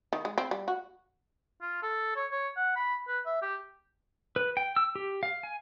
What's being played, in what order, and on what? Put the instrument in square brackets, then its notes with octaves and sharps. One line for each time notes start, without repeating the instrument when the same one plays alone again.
[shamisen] D#3
G#3
C4
G3
F#4
[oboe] F4
A4
C#5
C#5
F#5
B5
B4
E5
G4
[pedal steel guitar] B4
G5
E6
G4
F5
G#5